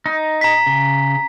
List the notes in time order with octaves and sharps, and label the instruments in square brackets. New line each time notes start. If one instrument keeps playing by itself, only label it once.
[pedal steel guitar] D#4
[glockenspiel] A#5 B6
[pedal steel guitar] C#3